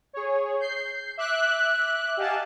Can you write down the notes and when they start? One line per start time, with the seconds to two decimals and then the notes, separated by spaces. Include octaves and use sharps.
0.13 G#4 C#5
0.60 G6 C7
1.17 E5 D6 F#6
2.17 G4 D#5 F5 F#5 G#5 A5